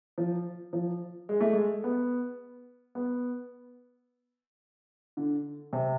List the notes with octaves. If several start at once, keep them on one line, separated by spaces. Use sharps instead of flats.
F3
F3
G#3
A3
G#3
B3
B3
D3
C3